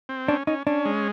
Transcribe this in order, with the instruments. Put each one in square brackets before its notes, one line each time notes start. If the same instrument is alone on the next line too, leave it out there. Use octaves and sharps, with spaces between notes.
[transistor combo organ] C4
[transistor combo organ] C#4 [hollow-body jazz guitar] D4
[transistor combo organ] C#4 [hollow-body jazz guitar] D#4
[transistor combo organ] C#4 [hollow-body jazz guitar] D4
[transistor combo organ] G#3